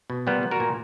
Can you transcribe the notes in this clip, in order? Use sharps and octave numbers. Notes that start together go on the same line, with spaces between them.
B2
A#2 G3 B3
A#2
F#4 A#4
A#2